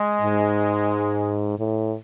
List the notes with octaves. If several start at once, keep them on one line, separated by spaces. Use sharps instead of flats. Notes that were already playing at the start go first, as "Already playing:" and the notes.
Already playing: G#3
G#2
A2